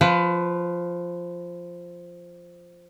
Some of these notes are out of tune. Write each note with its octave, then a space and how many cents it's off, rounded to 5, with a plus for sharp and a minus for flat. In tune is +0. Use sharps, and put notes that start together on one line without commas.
F3 +0 B4 +25